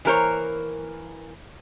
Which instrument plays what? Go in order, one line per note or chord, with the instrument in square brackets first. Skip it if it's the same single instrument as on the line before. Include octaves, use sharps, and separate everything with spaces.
[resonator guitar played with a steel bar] E3 A#3 A#4 C5 C#5